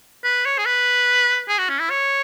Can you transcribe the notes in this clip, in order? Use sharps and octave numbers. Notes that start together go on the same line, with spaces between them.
B4
C#5
G#4
B4
G#4
F#4
C#4
E4
C#5